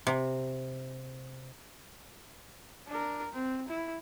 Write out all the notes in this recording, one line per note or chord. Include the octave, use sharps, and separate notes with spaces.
C3
D4 A#4
C4
E4